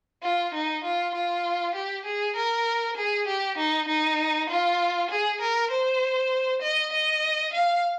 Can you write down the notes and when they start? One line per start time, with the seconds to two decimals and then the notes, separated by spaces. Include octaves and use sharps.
0.23 F4
0.54 D#4
0.84 F4
1.15 F4
1.75 G4
2.05 G#4
2.36 A#4
2.97 G#4
3.27 G4
3.58 D#4
3.88 D#4
4.50 F4
5.11 G#4
5.41 A#4
5.71 C5
6.62 D#5
6.93 D#5
7.53 F5